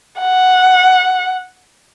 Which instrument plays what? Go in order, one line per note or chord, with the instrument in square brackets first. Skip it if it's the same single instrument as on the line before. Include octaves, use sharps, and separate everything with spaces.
[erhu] F#5